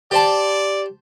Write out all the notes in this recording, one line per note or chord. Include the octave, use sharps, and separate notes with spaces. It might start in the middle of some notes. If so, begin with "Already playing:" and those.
G4 C5 D5 A5